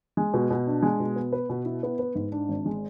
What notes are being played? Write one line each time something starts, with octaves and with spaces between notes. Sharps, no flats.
G#3
B2
B2
D4
G#3
B2
B3
B4
B2
E4
B3
B4
G#2
D4
G#1
G#3